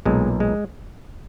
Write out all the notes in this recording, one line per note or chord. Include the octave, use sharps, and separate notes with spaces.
B1 A#2 G#3
G#3